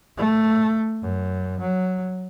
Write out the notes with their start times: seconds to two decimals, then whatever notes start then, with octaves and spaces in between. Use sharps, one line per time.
0.17 A3
1.01 F#2
1.60 F#3